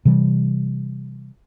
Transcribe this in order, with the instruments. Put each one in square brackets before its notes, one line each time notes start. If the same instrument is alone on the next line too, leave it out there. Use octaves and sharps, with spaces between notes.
[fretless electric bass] C3 E3 G3